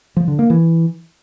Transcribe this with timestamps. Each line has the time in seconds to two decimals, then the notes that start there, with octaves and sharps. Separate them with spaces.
0.17 F3
0.28 D3
0.39 A#3
0.50 E3